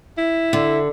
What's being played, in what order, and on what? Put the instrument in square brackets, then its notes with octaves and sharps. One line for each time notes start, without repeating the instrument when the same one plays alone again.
[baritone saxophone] E4
[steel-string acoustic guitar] D3